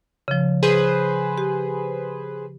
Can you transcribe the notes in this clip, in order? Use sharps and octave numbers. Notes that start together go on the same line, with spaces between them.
C#3 F3
G#4 B4 C5
G4